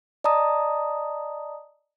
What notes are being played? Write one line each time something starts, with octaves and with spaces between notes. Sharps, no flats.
D5 D#5 A5 A#5 D#6